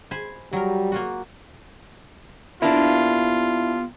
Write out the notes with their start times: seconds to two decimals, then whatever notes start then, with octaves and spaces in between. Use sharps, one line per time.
0.11 C5 G#5 B5
0.53 F#3 G3 A#4
0.92 A#3 F4 F#4
2.62 A#3 B3 D4 E4 F4 G4